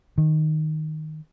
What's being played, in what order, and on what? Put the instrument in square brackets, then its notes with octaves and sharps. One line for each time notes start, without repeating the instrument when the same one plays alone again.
[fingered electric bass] D#3